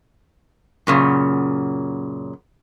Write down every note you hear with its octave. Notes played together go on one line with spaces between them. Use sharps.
F#2 A#2 C#3